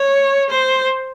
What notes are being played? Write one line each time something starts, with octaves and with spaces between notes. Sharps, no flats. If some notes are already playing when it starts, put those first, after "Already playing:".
Already playing: C#5
C5